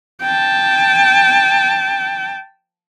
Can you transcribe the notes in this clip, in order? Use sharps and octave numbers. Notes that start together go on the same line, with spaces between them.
G5 A5